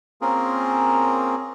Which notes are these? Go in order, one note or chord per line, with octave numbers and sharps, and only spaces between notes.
A#3 C4 C#4 F4 G#4 A#4